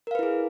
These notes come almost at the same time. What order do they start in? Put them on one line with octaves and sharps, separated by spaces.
A#4 F5 B4 E4 G#4